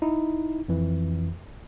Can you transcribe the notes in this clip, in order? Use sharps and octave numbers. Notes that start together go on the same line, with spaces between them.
D#4 E4
F2 E3